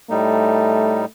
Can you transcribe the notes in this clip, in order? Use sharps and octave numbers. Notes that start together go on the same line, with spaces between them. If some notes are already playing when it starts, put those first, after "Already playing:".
A2 G3 A3 D#4